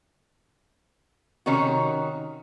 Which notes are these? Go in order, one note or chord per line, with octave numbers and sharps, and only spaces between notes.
C3 D#3 C#4 D#4 F#4